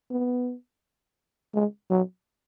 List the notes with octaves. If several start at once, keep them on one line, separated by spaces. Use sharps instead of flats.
B3
G#3
F#3